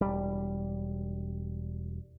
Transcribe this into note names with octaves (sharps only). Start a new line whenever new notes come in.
E1 B1 G3